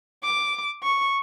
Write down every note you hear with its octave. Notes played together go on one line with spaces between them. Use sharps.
D6
C#6